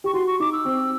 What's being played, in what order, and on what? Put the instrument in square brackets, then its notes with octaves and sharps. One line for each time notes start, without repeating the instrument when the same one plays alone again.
[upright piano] G4 [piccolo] C#6
[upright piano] F#4 [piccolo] C6
[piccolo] C#6
[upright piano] D#4 [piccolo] D6
[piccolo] E6
[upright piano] C4